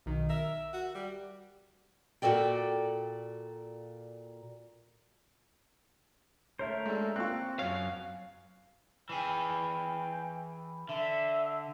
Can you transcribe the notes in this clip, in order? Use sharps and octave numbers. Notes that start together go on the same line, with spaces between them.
B1 D#3
A#4 E5
F#4
G3
A#2 F#4 A4 D5 G5
A3 A#4 C5 C#5 E5
G#3 D4 A4
A#3 C4 F4 C#6 E6 F#6
F#2 C#5 F5
E3 G#4 G5
D3 E5